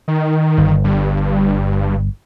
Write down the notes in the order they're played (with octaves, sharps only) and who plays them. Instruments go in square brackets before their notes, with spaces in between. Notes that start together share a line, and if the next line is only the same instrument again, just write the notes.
[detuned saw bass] D#3
[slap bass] G1
[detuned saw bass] G2